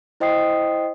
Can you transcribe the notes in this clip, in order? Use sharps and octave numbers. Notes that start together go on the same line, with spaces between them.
E4 C5 D#5 G5 D#6 C7